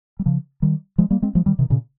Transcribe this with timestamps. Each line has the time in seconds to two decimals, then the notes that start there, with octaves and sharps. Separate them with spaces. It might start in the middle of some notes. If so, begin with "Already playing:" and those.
0.19 G3
0.26 C#3 F3
0.62 D#3 G3
0.98 F3 G#3
1.11 G3 A#3
1.22 G#3 C4
1.35 F3 G#3
1.46 D#3 G3
1.59 C3 D#3
1.70 A#2 C#3